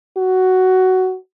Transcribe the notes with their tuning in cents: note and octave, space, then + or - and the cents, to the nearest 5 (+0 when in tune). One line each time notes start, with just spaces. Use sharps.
F#4 +10